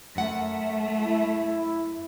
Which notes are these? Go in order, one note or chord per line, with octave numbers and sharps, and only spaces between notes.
F#2 A3 F#5
E4